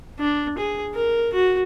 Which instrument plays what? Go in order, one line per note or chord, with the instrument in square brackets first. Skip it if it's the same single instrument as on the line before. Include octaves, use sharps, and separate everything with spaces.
[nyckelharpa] D4
G#4
A#4
F#4